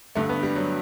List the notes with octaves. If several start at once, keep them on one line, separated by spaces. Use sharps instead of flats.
G2 D3 A3
B3
G3
F#3